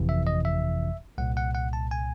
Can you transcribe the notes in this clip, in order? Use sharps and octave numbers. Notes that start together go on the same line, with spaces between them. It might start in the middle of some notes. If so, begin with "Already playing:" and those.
Already playing: G1 F2 C3 E3
E5
D#5
E5
C2 A#2 F#5
F#5
F#5
A5
G#5